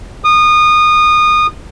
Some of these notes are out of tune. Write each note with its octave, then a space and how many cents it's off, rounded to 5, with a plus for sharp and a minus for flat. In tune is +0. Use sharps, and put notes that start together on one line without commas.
D#6 -25